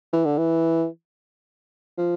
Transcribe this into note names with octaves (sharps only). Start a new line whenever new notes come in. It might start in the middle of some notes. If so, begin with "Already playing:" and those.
E3
D3
E3
F3